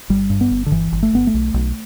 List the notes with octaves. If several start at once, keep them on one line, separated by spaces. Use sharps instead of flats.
G1 G3
G2
B3
G1
D3
G1 E3
G1
A3
G1 B3
A3
B1
B1